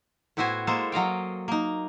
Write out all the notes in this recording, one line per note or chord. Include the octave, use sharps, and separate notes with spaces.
A2 B3 E4 F#4 C5 G#5
G#3 A#3 A4 C5
F#3 D#5 F5 G5
A#3 D#4